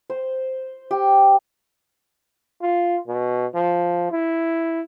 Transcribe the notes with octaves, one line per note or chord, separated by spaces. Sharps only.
C5
G4
F4
B2
F3
E4